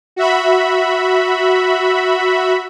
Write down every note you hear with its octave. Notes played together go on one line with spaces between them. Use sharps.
F#4 E5 B5